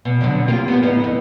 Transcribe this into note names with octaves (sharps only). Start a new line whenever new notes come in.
B2
F2 D3 F#3
A#3 F4 G4
B3
A2 B3 D#4
F2